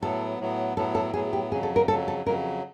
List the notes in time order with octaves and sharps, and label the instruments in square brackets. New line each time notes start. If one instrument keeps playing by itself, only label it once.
[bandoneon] A2 F#3 B3 [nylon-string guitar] A4
[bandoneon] A2 F#3 B3
[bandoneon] A2 F#3 B3 [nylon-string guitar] A4
[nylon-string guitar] A4
[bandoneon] A2 F#3 B3 [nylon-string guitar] G#4
[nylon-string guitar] G4
[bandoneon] F2 C#3 F#3 [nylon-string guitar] G#4
[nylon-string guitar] A4
A#4
[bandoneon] F2 C#3 F#3 [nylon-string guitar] A4
[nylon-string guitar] A4
[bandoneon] F2 C#3 F#3 [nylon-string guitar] A#4